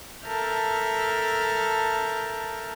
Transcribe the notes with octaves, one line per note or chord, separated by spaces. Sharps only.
A4 A#4 E5 A5 F6 G6